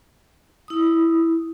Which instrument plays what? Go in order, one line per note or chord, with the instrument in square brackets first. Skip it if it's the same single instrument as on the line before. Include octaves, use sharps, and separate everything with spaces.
[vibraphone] E4 D#6